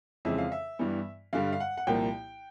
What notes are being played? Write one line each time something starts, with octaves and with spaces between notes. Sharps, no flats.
F2 C#3 E3 G#3 C4 E5
F5
E5
G2 E3 G3 B3
G2 D3 G3 F5
F5
F#5
F#5
C2 A#2 F3 A#3 G5